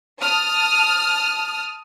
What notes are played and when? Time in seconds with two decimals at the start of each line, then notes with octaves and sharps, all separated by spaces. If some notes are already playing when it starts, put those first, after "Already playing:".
0.20 A5 D#6 F6